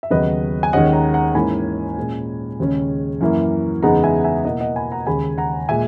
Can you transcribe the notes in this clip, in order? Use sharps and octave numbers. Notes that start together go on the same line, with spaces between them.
E5
D#2 C#3 F#3 B3 B4 D#5
G#5
D#2 D#3 G#3 C#4 D#5 F#5
F#5 A#5
F#5 A#5
G#2 E3 A#3 C#4 E4 G#5 B5
A#2 G#3 C#4
D#2 C#3 G#3 C#4
F#2 E3 A#3 E4
E2 C#3 G#3 B3 D#4 F#5 A#5
E5 G#5
F#5
E5 G#5
B2 A#3 E4 D#5 F#5
D#5 F#5
G#5 B5
F#5 A#5
D#2 C#3 G#3 G#5 B5
F#5 A#5
A#2 G#3 E5 G#5